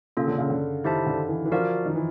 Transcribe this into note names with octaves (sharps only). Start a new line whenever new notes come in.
C#3 A#3 C#4 F4 A4
D3
C#3
D3
D#3 E4 G4 C5 E5 A5
D3
E3
E3
F3 F#4 A#4 D5 F5
D#3
E3